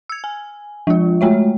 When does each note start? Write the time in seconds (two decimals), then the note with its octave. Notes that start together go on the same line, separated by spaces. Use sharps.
0.09 E6 G#6
0.24 G#5
0.87 F3 G#3 F4
1.21 G#3 A3 C#5 E5